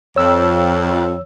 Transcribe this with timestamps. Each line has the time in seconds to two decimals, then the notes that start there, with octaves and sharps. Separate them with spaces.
0.16 F2 C#5 E6